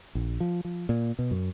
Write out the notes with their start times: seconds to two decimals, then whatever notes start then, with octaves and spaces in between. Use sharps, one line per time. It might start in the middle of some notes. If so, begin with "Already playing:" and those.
0.15 A#1
0.40 F3
0.65 F3
0.89 A#2
1.19 B2
1.31 F#2